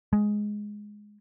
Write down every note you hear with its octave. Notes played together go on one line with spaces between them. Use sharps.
G#3